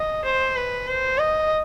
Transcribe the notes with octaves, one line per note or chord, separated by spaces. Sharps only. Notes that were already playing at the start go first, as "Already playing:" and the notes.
Already playing: D#5
C5
B4
C5
D#5